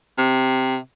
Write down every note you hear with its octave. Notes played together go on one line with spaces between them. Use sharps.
C3